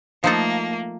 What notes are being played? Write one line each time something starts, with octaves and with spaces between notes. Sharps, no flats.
F3 A3 A#3 D#4 A4